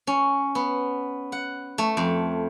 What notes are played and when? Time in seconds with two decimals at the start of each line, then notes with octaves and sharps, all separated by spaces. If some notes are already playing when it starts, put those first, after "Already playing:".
0.07 C#4
0.55 B3
1.32 F#5
1.78 A3
1.97 F2